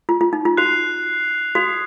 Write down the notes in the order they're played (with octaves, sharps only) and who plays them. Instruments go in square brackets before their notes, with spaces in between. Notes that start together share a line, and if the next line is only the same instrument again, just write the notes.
[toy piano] F4
F4
D#4
F4
[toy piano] F#4 [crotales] F#6 C7 F7
[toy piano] F#4 [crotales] D#6 G#6 C7 F7